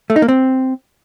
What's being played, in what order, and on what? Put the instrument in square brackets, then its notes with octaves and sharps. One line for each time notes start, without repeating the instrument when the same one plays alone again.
[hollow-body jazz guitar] A3
D#4
A#3
C4